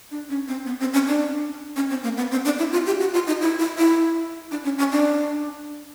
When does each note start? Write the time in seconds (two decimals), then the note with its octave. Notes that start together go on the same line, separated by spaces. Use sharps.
0.11 D4
0.29 C#4
0.48 C4
0.66 B3
0.80 C4
0.94 C#4
1.08 D4
1.76 C#4
1.90 C4
2.03 A#3
2.17 B3
2.31 C4
2.45 D4
2.59 E4
2.72 F4
2.86 G4
3.00 F#4
3.14 F4
3.27 D#4
3.41 E4
3.59 E4
3.78 E4
4.51 D4
4.64 C#4
4.78 C#4
4.92 D4